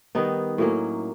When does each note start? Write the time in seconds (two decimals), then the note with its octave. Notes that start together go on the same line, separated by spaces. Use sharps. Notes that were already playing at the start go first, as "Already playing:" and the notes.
0.15 D#3 G3 B3 D#4
0.58 A2 F#3 A#3 C#4